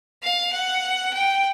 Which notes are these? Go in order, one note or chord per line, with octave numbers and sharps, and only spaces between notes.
F5
F#5
G5